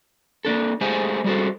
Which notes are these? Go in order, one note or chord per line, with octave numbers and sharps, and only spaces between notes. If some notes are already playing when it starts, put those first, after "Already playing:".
A#3 D4 A4
G#3 A3 G4 G#4 C5 G#5
G3 G#3 F#4 A4 C5